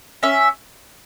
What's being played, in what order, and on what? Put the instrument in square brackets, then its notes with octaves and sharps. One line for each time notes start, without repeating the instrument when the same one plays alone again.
[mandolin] C#4 E5